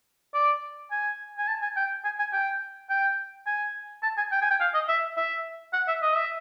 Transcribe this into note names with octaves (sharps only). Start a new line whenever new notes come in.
D5
G#5
G#5
A5
G#5
G5
G#5
G#5
G5
G5
G#5
A5
G#5
G5
G#5
G5
F5
D#5
E5
E5
F#5
E5
D#5
E5